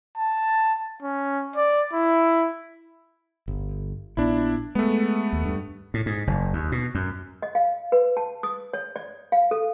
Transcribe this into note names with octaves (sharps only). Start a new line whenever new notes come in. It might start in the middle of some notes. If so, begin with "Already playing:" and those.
A5
C#4
D5
E4
G1
A#1 B3 D4 E4
G#3 A3 B3
D#2
G2
A2
G#2
F#1
D#2
B2
F#2
D#5
F5
B4
A5
D#6
C#5
D5
F5
A4